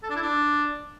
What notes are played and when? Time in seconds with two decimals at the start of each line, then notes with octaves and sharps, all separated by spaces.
0.03 A4
0.09 D4
0.16 E4
0.22 D4